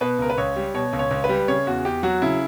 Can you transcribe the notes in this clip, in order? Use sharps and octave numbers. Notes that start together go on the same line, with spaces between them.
B2 B4
C#2 A#4
B4
C#2 C#5
G3
B2 C#5
C#2
C#5
C#2
B4
G3
C#3 C#5
E2 F#4
E2 G4
F#3 F#4
C#3 E4